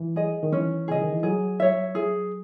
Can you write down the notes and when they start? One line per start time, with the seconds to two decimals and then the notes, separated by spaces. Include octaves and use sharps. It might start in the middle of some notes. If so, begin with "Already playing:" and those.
Already playing: E3
0.16 G#4 D#5
0.43 D#3
0.52 E3 C#4
0.88 C#3 G#4 D#5
1.02 D#3
1.12 E3
1.23 F#3 G#4
1.60 C#5 E5
1.95 G#4